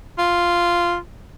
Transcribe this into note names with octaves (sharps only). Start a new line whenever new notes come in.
F4